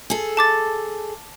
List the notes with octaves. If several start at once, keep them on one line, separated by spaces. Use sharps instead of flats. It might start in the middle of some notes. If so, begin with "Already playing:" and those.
G#4 A4
A5 D6 A6